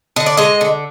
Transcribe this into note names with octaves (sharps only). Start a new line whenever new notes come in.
D3 D#5
D5
G#3 D#5
D3